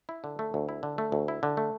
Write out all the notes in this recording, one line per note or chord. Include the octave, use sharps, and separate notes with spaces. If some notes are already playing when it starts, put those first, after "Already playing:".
E4
D3
A3
D2
E4
D3
A3
D2
E4
D3
A3